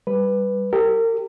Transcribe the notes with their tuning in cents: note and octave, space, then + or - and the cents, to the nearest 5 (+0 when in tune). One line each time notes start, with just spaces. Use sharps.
G3 +0 B4 +0
G4 +0 A#4 -35